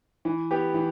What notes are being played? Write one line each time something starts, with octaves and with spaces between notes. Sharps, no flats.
E3
B3 G4
E3